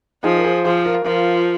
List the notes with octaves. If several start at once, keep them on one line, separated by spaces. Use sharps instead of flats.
F3 D#4 G#4
A#4
G#4 C5
F3 G#4 C5
F4 A#4
F3 F4 A#4